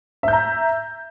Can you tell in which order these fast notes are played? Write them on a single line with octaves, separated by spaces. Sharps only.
E5 G6 A#5